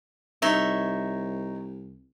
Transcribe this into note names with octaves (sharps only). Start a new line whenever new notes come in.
C2 D#4 C#5 E5